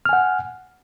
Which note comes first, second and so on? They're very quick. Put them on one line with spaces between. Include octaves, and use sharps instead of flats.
F6 G#5 F#5